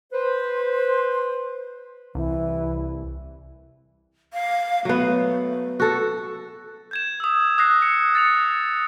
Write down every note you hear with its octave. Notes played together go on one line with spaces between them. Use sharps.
B4 C5
C2 E3
F5
F#3 A3 B3
F#4 A4
G6 G#6 E7
D#6 E6
D#6 F#6 A#6 C7
C#7
A6 C#7 F7